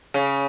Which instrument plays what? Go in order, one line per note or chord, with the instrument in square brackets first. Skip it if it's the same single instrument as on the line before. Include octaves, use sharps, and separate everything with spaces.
[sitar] C#3